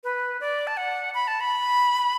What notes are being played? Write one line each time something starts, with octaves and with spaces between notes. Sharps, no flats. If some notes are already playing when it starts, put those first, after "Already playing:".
B4
D5
A5
F#5
B5
A5
B5